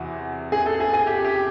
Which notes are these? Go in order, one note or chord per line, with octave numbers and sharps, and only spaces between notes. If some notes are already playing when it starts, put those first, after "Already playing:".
Already playing: E2 C3 E3 F#4
G#4
A4
G#4
G#4
G4
G4